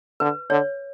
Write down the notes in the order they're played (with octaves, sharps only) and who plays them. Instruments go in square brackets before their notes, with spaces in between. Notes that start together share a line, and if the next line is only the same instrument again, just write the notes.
[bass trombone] D3 [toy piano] B4
[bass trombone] D3 [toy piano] C#5